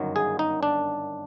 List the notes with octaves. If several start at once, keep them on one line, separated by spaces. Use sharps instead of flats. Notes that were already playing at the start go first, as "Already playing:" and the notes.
Already playing: G1 F#2 D#3 F#3
G#4
D#4
D4